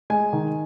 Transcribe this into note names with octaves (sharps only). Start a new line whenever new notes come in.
G#3 G#5
D#3